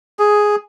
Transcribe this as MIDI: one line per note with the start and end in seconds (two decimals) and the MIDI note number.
0.19 0.56 68